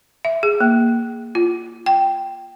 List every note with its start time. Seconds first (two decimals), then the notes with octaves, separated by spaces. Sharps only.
0.25 E5
0.43 G#4
0.61 A#3
1.35 F4
1.86 G5